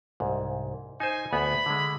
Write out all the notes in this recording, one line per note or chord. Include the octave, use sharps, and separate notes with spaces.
C2 G#2
D#4 C5 G#5
D2 B3 B5
D3 G#3